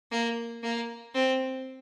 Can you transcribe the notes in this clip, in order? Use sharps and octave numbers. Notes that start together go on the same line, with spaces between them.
A#3
A#3
C4